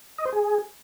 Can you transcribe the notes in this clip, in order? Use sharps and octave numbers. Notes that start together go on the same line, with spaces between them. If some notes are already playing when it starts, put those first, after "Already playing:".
D#5
C5
G#4